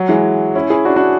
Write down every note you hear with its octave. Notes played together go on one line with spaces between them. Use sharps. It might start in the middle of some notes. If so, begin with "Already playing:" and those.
Already playing: F#3
E3 G#3
C#4 E4
E4 G#4
D4 F#4
D4 F#4